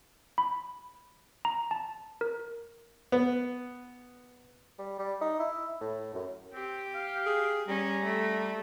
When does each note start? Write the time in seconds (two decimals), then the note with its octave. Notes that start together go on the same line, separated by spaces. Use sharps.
0.38 B5
1.45 A#5
1.71 A5
2.21 A#4
3.12 B3
4.79 G3
4.99 G3
5.21 D#4
5.39 E4
5.81 A2
6.14 F#2
6.53 C4 G4
6.95 F5
7.26 G#4
7.68 G3 C#4 A#5
8.04 A3